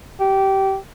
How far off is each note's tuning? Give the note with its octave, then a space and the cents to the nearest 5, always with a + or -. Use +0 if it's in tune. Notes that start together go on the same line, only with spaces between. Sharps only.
G4 -20